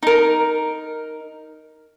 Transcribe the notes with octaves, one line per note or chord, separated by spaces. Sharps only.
D#4 A#4